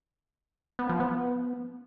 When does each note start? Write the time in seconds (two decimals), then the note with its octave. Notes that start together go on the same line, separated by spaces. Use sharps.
0.79 B3
0.89 F3
1.00 B3